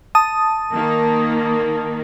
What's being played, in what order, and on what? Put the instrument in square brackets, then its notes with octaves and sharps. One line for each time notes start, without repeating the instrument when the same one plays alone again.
[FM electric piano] A5 D#6
[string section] D#3 A#3